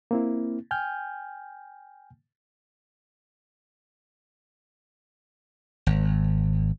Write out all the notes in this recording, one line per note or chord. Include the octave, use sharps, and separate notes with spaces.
A#3 C4 E4
G5 G#5 F6 G6
G#1